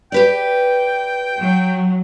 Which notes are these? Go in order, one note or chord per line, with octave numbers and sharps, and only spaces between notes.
G4 B4 D5 G5
F#3